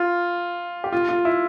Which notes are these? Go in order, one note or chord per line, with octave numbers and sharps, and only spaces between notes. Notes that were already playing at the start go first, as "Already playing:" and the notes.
Already playing: F4
G4
F4
F4
E4